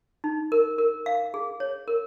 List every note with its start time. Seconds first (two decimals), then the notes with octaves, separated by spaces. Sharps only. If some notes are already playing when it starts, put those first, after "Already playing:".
0.24 D#4
0.52 A#4
0.78 A#4
1.06 F5
1.34 G#4
1.60 C#5
1.88 A#4